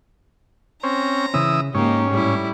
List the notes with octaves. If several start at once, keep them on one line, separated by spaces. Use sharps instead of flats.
C4 C#4 A#5
C#3 E3 C#4 D#6 E6
G#2 A#3 C#4 D#4 G4
A2 G3 E4